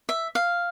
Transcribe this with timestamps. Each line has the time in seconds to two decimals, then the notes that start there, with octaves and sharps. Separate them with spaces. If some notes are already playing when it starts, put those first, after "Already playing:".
0.09 E5
0.35 F5